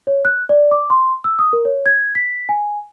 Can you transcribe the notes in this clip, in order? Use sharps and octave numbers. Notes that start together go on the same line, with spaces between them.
C#5
F#6
D5
D6
C6
E6
D#6
A#4
C#5
G#6
B6
G#5